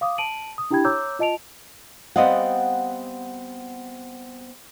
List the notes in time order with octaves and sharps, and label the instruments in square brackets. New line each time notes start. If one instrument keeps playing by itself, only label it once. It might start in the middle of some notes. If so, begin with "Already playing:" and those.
[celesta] F5 D6 D#6
A5 D7 D#7 F#7
D#6
D4 E4 G4 G5 B5 G#6
C#5 A#5 D6 E6 G6
F4 D#5 A5 D7 F7
[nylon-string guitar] G3 B3 C4 D#5 F5 F#5